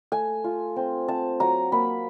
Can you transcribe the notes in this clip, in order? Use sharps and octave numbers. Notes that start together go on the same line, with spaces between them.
A3 G#5
F4
C4
C4 A5
F#3 A#5
A#3 B5